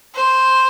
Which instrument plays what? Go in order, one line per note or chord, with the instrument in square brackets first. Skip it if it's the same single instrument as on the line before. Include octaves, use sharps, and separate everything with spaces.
[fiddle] C5